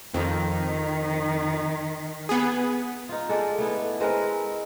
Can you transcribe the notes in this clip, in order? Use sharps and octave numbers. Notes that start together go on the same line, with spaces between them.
F2 D#3
B3 G#4
D#4 F4
G#3 D4 A4
A3 B3 E4
G#3 C4 A#4 B4